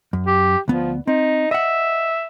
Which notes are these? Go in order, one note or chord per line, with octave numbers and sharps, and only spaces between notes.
F#2
G4
D2 F3 B3
C4 D#4
D#5 E5 F#5